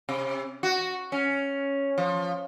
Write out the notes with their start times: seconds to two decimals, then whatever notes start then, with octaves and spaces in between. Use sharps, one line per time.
0.09 C3
0.63 F#4
1.12 C#4
1.98 F3